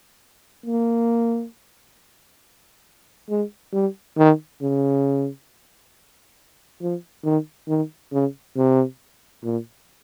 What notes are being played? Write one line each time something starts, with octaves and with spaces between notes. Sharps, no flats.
A#3
G#3
G3
D#3
C#3
F3
D#3
D#3
C#3
C3
A#2